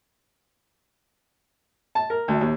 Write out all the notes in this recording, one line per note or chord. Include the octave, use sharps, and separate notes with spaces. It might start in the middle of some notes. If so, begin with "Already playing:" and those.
A5
A#4
D2
D#2